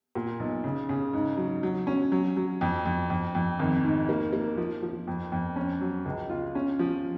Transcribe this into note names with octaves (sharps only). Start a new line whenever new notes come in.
A#2
B1
C#3
C#3
G#2
F#3
F#3
C#4
F#3
F#3
F2
F2
F2
F2
G#1
G#2
A#3
A#3
F3
F3
F2
F2
C#4
F#3
C#2
F4
C#4
F3